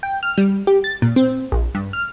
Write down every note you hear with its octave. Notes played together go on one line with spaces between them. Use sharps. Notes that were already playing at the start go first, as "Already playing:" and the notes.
G5
F6
G3
G4
A6
A#2
C4
A#1
G2
F6